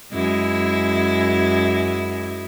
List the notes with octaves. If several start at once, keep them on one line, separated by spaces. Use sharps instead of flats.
F#2 G#3 E4